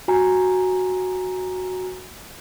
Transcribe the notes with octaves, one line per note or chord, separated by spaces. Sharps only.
F#4 G#5 A#5